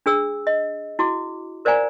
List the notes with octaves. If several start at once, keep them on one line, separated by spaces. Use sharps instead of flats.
D4 G#4 E6
D#5
E4 F#4 D6
A#4 C5 D5 F#5 G#5 A#5